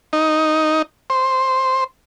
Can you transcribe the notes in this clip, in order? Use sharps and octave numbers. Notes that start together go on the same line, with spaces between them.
D#4
C5